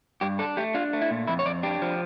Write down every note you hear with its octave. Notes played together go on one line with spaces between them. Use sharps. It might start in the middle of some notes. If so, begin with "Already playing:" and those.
G2 G4
D4 A4
A3 G4
D4 F4
A3
E4
A#2
F2 E4
C#5
F2 D5
D4 G4
F3